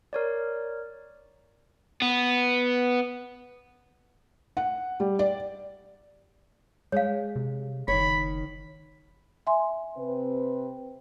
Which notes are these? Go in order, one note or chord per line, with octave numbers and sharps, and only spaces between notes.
A#4 C#5 D5
B3
F#5
G3
D5
G#3 C#5 F5
C3
F#1 D#3 C#5 B5
E5 G#5 C6
C3 C4 B4